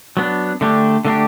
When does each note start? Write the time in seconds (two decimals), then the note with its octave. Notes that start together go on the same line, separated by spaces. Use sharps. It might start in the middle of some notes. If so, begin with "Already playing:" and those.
0.17 F#3 B3 D4
0.61 D3 A3 D4 G4
1.05 D3 A3 D4 G4